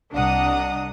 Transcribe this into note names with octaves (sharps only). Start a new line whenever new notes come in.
C2 D4 D#5 F#5 A#5 D#6